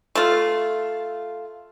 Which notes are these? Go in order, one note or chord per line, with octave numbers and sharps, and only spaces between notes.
A3 F4